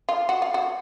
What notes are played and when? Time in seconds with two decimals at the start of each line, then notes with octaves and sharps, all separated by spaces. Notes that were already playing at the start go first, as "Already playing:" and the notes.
0.09 F4
0.29 F#4
0.42 F4
0.54 F#4